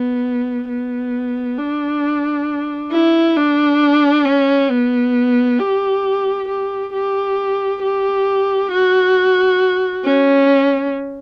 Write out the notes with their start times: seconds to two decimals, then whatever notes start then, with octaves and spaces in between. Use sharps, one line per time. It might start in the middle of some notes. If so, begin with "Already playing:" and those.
Already playing: B3
0.69 B3
1.58 D4
2.91 E4
3.36 D4
4.25 C#4
4.70 B3
5.59 G4
6.48 G4
6.93 G4
7.82 G4
8.71 F#4
10.05 C#4